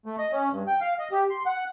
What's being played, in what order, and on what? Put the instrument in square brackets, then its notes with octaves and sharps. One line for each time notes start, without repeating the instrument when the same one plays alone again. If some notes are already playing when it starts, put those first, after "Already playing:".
[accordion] A3
D#5
C#4
G2
G5
F5
D#5
G4
C6
F#5